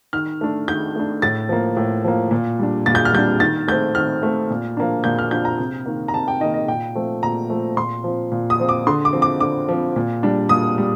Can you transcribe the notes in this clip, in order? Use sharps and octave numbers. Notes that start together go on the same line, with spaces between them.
D#3 F6
A3 D4
D#3 G6
A3 D4
A2 A6
F3 A#3
A2
F3 A#3
A#2
G3 D4
A#2 A6
G6
F6
G3 D4 G6
D#3 A6
A3 C4 G6
D#3 F6
A3 C4
A#2
F3 A#3 D4
A#2 G6
F6
F3 A#3 D4 G6
A#5
C3
D#3 A#3
A#5
C3 A5
G5
D#3 A#3 D#5
D#5
A#2 G5
F3 A3 C4
A#2 A#5
F3 A3 C4
A#2 C6
F3 C4
A#2
D#6
F3 C4
D6
D3 C6
D6
F3 C4
D6
D3 D6
F3 C4
A#2
G3 D4
A#2 D#6
G3